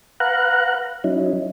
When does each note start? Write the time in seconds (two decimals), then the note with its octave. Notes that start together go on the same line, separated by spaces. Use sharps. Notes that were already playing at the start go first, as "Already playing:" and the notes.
0.20 B4 F5 F#5 A#5 F#6
1.04 F#3 C#4 D#4 E4